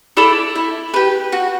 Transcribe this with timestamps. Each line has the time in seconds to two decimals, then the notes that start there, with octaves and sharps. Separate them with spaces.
0.17 E4 A4 D5
0.56 E4
0.94 G4 B4
1.32 F#4